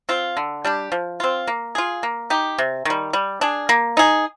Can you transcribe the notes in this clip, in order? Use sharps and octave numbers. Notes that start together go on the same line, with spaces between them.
C4 F4
D3
G3 D4 G4
F3
C4 F4
A#3
F4 G#4
A#3
D#4 G4
C3
D#3 G3
G3
D4 G#4
A#3
D#4 G#4